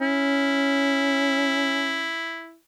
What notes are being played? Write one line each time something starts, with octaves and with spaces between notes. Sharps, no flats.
C#4 E4